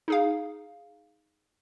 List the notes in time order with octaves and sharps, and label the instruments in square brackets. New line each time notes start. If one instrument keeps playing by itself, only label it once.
[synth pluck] D#4 G#4 F5